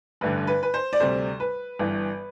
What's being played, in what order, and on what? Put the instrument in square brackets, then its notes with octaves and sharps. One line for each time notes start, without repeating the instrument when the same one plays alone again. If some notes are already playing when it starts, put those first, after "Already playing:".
[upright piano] A1 G2 D3 B4
B4
B4
C5
D5
D2 C3 G3 C5
B4
G1 G2 E3